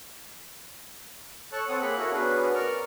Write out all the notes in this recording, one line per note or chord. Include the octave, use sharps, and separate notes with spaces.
A4 C#5 A5 C#6 F#6
C4 A4 C#5 F#5 D#6
A#3 G#4 B5 F#6
E4 F#4 A4 A#4 C#5
B3 C#4 D4 F#4 G#4 B4
A#4 D5 C#6 F6